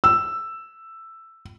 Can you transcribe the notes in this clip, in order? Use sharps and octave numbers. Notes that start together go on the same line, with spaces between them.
E6